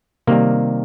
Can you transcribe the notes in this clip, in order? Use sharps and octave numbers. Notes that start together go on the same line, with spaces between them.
C3 D#3 G3 A#3